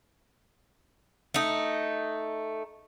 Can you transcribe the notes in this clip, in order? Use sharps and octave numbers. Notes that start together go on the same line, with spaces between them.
A3 D#4